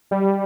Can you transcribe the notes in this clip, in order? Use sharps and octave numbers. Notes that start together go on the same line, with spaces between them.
G3